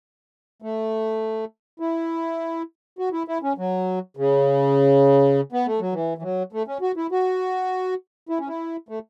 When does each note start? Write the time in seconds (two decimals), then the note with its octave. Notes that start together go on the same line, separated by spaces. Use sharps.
0.62 A3
1.80 E4
2.99 F#4
3.13 E4
3.28 E4
3.43 C#4
3.58 F#3
4.17 C#3
5.52 B3
5.66 A3
5.80 F#3
5.93 E3
6.18 E3
6.22 F#3
6.52 A3
6.67 C#4
6.81 F#4
6.96 E4
7.12 F#4
8.29 E4
8.39 C#4
8.48 E4
8.89 A3